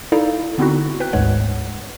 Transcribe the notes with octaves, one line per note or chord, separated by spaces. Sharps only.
D#4 E4 A4 D5 F5
D3 B3 C4 D#4 E4 F#4
B4 G5 F#6
G#1 D2 G#2 G#3 C#5 F#5